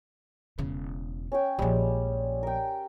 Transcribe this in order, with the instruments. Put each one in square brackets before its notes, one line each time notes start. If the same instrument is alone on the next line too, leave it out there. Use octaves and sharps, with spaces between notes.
[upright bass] E1 C#3
[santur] C#4 C#5 G5
[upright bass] A#1 F3 [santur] G3 G#3
[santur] A#4 G5